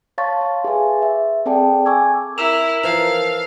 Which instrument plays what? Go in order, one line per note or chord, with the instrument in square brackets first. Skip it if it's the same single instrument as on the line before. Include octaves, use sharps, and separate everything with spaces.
[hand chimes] C#5 F5 A5 C6 C#6 A6
F5 C6
G#4 B4 E5 G#5
E5
C4 G#4 A4 D5 G5 A5
G#5 C#6 D6 E6 G#6
[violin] E4 [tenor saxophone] A#4 [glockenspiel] E6 E7 F7
[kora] E3 F3 [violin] F5 [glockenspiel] F7